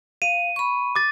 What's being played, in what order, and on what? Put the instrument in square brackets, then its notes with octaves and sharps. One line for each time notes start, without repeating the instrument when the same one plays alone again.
[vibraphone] F5 [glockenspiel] D#7
[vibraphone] B5 C#6
[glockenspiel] D6 A6